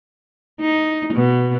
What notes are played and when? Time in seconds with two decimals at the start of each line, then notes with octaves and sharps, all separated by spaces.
0.61 D#4
1.14 B2